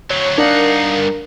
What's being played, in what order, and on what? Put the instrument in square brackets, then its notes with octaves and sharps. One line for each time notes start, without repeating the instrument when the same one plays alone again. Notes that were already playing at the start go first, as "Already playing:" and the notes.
[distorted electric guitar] D2 F#3 [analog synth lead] C#5
[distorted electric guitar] G2 F#5 [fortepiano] D4 [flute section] D#4 F5 [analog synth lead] A#4